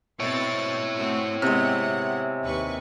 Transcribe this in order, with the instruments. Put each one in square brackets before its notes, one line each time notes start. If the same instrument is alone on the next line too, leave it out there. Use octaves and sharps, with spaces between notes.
[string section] B2 C4 A6 [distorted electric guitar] E4 C#5
[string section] A3 C4 F#4
[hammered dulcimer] C3 G#3 [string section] B3 C4 F#5
[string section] D#2 B4 C#6